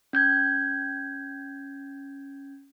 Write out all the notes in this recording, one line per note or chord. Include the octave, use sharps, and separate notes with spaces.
C#4 G6 G#6